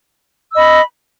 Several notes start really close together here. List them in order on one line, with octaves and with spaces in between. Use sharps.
E6 D#5 B5